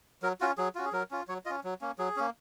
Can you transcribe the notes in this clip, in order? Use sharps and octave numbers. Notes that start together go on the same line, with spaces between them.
F#3 A#4
C#4 F4 F#4
F#3 G#4
C#4 F4 F#4
G#4
F#3 A#4
C#4 F4
F#3 C#5
C#4 F4 D#5
F#3
A#3 C#4
F#3 G#4
A#3 C#4